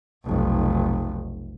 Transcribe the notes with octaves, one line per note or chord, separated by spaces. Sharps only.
F1 B1